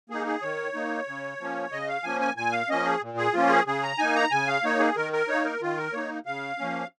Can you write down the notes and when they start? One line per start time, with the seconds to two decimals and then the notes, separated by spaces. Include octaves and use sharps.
0.10 A#3 D#4 G#4
0.26 G#4
0.42 D#3 C#5
0.74 A#3 D#4
1.07 C#3
1.40 F3 A#3 C#4
1.71 C#3 D#5
1.88 F5
2.04 F3 A#3 C#4 G#5
2.21 G#5
2.36 A#2 G#5
2.52 F5
2.69 F3 A#3 C#4 D#5
2.85 G#4
3.01 A#2
3.18 G#4
3.34 F3 A#3 C#4 F4
3.50 G#4
3.66 C#3 G#4
3.83 A#5
3.98 A#3 D#4 G#5
4.15 A#5
4.31 C#3 G#5
4.48 F5
4.64 A#3 D#4 C#5
4.79 G#4
4.96 D#3 A#4
5.13 A#4
5.28 A#3 D#4 C#5
5.44 A#4
5.61 D#3 F4
5.77 A#4
5.93 A#3 D#4 C#5
6.26 C#3 F5
6.58 F3 A#3 C#4